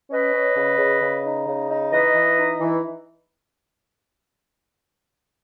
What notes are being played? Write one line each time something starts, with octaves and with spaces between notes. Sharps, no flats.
C#4 B4 D#5
C#4
C#3
C#3
C#3
D#4
C#3
D#4
E3 B4 D#5
E3
D#4
E3